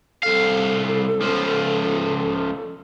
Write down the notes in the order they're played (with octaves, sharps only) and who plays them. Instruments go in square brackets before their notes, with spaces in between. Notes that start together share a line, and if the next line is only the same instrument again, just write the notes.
[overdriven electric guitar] C2 F5 [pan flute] A4
[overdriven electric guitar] C#2 F3